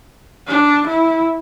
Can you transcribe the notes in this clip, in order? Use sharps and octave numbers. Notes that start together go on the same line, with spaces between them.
D4
E4